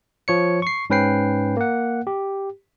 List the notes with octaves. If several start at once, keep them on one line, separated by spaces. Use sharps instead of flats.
F3 C#5 C#7
C#6 C7
G#2 C#4 B4 G5 C7
A#3 F#5
G4